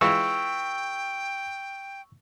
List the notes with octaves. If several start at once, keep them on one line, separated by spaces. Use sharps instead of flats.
E3 G#3 F4 G5 C#6 E6